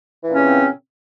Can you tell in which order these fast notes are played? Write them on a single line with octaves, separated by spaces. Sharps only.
E3 A#2 C#4 C#3 C4